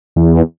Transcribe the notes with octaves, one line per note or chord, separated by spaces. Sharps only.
E2